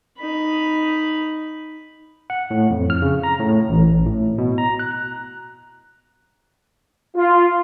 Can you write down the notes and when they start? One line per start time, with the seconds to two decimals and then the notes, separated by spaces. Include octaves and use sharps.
0.19 D#4 B5
2.30 F#5
2.51 A2
2.70 F2
2.90 F6
3.02 C#3
3.23 A#5
3.39 A2
3.69 A1
4.06 A2
4.38 B2
4.58 A#5
4.79 F#6
7.16 F4